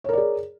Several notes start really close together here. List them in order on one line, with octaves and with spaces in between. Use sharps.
C#5 A#4 D5 G#4